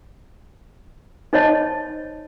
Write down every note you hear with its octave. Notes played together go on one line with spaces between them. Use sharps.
D#4 C5 C#5 D#5 A5